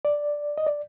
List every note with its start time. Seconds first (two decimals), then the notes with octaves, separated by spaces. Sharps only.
0.05 D5
0.58 D#5
0.67 D5